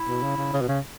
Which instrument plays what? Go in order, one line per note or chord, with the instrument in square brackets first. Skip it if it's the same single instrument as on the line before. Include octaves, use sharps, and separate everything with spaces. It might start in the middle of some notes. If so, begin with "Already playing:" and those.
Already playing: [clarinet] E4
[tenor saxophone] B2
C#3
C#3
C#3
B2
C#3